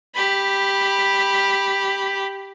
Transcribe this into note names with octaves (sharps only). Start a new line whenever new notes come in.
G4 B5